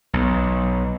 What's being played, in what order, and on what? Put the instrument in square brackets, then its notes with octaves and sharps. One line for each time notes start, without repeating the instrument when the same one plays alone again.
[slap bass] B1